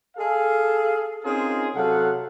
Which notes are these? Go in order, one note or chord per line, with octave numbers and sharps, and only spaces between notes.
G#4 A4 F5
C4 C#4 D#4 F4 G#4 A#4
C3 F#3 A4 F5 F#5